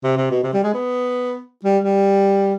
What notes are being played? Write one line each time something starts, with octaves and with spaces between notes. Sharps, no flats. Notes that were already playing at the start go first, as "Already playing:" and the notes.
C3
C3
B2
C3
G3
G#3
B3
G3
G3